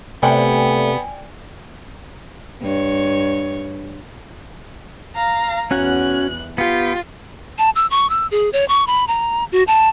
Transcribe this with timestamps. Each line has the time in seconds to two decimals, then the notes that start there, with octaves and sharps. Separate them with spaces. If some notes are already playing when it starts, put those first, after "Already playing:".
0.23 C3 A3 B3 D5 G5 G#5
2.62 G2 C#5
5.15 F5 A#5
5.71 E2 C#4 F#4 F#5 F#6
6.58 B3 F4 G4
7.58 A5
7.75 E6
7.91 C#6
8.10 E6
8.31 G#4
8.53 C#5
8.68 C#6
8.87 B5
9.08 A#5
9.52 F#4
9.67 A5